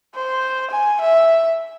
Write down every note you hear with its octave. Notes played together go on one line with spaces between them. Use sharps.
C5
G#5
E5